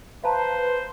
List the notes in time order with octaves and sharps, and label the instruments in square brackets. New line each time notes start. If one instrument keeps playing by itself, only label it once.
[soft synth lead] B4 [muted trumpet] C5 [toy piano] F5 A5 A#5